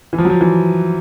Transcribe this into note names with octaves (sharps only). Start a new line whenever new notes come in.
E3
F3
F#3
F3
E3